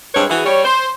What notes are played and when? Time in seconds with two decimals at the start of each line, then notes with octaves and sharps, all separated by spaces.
0.14 G2 G#3 C4 B4 C#5
0.29 E3 E4 F#4 G#4
0.45 G3 C#5
0.64 C5